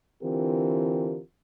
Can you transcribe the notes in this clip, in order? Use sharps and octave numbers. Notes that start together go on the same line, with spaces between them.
D3 E3 C4 F4 G4 A#4